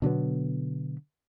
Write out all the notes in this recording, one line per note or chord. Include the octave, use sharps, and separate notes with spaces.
B2 D3 F#3 B3